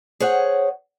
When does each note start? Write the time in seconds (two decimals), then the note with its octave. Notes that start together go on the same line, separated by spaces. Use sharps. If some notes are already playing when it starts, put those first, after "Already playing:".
0.20 G#4 C5 C#5 F#5